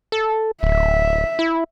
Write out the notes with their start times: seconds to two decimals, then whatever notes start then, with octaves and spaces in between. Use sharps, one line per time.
0.12 A4
0.63 D1 E5
1.39 E4